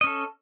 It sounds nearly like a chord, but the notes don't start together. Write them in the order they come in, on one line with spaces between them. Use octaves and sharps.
D#5 C#4 A4